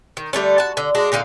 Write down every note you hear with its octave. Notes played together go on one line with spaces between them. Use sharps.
D#3
D3 G3 A3 C#4
F#4 A5
D3
G#3 D4 F#4
A#2 D3 D#4 F5